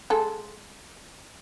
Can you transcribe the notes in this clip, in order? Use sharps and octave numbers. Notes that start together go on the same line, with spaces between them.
G#3 A4